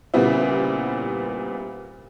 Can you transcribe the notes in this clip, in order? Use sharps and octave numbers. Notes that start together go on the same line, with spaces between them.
A#2 C#3 G3 B3 C4 E4